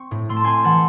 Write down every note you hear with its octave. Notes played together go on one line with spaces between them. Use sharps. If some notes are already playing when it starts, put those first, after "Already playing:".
Already playing: C4 C#6
A2
A3 C6
A5
C4 G#5 C6
E3 F#5 A5